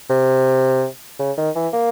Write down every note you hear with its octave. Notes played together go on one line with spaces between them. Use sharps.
C3
C#3
D#3
E3
A#3